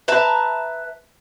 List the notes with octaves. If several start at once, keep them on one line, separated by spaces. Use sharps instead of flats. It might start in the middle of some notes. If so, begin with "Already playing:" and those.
B4 E5 A5 A#5